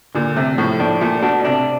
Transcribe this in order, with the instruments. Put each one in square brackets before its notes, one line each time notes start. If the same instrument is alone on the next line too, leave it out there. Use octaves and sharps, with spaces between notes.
[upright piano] A#2 [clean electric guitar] D3
[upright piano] C3 [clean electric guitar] A3
[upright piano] A2 [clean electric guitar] F3
[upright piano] A2 [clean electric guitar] D4
[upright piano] A#2 [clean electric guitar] A3
[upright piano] B2 [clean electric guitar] D4
[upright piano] C3 [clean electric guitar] D4